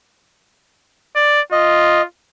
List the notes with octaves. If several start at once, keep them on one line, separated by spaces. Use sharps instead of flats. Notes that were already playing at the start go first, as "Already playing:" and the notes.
D5
F4 D#5